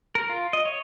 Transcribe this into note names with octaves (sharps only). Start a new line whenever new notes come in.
A#4
F4
D#5
C#5